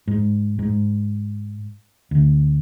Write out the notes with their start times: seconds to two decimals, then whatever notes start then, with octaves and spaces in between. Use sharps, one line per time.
0.07 G#2
0.59 G#2
2.11 D2